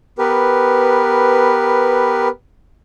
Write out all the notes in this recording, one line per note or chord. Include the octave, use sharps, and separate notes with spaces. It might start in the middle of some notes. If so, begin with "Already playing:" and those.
B3 G4 A#4 B4